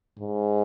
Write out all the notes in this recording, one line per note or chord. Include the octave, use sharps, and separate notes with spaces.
G#2